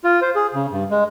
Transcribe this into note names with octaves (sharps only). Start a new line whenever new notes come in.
F4
C5
G#4
C#3
G2
G#3